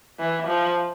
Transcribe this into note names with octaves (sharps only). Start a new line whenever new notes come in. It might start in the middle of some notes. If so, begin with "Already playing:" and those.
E3
F3